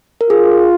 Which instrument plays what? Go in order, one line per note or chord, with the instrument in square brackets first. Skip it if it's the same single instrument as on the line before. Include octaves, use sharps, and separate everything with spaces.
[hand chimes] A#4
[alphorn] F4 [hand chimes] G#4